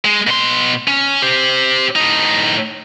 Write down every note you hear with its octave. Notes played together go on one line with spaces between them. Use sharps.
G#3
B2 C6
C#4
G4 C5
A2 D#4